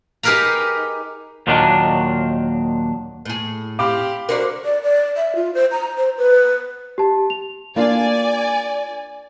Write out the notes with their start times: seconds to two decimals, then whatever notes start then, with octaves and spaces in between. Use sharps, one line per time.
0.23 D#4 G4 G#4 A#4 B4 A#5
1.47 D#2 A#2 D#3 F#3 D4
3.25 A2 G#4
3.79 C4 G4 F5 B5 D6
4.29 D3 G3 F#4 A#4 C5 D5
4.65 D5
4.83 D5
5.17 E5
5.36 F4
5.54 C5
5.72 A#5
5.98 C5
6.18 B4
6.98 G4 A5
7.30 F7
7.76 A#3 D4 F4 D5 G#5